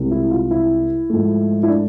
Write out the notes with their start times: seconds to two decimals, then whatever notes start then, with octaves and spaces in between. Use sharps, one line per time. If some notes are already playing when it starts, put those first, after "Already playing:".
Already playing: C2 C3 G#3
0.11 E4
0.31 F4
0.51 E4
1.10 G#2 F3 A3
1.63 E4
1.68 D4